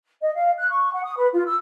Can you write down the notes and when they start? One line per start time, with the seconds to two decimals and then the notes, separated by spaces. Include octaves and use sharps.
0.22 D#5
0.35 F5
0.59 F#6
0.70 C#6
0.93 F#5
1.04 D#6
1.17 B4
1.33 F4
1.47 E6